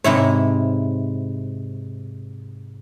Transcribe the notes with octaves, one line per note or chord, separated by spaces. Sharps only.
G#2 C3 E4 C#5